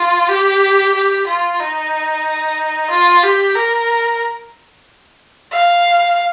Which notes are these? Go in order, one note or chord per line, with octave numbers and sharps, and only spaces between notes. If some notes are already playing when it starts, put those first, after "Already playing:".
Already playing: F4
G4
G4
F4
D#4
F4
G4
A#4
F5